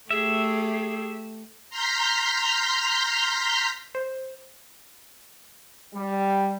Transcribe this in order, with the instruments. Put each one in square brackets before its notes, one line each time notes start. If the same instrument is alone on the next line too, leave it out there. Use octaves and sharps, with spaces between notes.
[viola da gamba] A3 G4 [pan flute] G#4 [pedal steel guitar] E5
[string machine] A#5 C6 F6 G6 B6
[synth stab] C5
[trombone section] G3